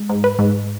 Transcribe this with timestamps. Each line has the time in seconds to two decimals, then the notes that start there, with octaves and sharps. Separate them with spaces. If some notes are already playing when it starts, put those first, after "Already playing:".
Already playing: G#3
0.09 G#2
0.24 B4
0.39 G#2